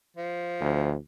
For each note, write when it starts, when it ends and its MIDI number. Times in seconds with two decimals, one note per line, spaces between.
0.17 0.95 53
0.61 0.96 38